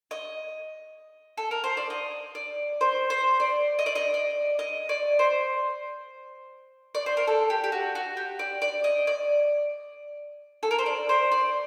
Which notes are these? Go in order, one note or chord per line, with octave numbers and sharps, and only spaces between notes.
D#5
A4
A#4
C5
D5
D#5
D5
C5
C5
D5
D#5
D5
D#5
D5
D#5
D5
C5
D5
C5
A#4
A4
G4
G4
F#4
F#4
G4
D5
D5
D#5
D5
A4
A#4
C5
D5
C5
D5